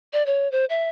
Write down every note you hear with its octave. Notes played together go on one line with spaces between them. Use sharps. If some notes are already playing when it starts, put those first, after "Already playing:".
D5
C#5
C5
E5